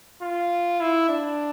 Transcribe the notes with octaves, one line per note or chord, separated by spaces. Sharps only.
F4
E4
D4